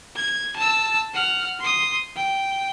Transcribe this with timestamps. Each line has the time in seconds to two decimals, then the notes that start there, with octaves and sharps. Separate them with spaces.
0.16 G#6
0.56 A5 E6
1.14 F#5 F6
1.60 C6 D#6
2.17 G5